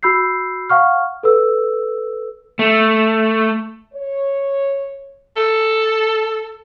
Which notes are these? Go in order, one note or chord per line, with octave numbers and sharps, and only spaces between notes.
F#4 B5 E6 G6 C7
F5 F#5 C#6 F6
A4 B4 E6
A3
C#5
A4